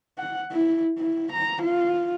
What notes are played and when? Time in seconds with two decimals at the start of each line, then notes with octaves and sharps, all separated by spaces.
0.18 F#5
0.52 E4
0.98 E4
1.32 A#5
1.62 F4